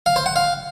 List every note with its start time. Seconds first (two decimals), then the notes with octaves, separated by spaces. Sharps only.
0.06 F5
0.16 C5
0.26 F#5
0.36 F5